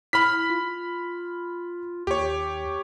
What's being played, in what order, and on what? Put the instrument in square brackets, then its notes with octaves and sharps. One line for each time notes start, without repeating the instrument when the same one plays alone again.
[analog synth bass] E4 [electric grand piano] B5 F6 B6
[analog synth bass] F4
[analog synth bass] D#2 [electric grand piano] G4 C#5